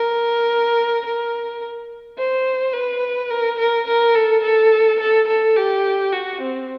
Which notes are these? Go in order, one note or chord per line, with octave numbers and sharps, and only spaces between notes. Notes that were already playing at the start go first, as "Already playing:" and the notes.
Already playing: A#4
A#4
C5
B4
A#4
A#4
A#4
A4
A4
A4
A4
G4
F#4
C4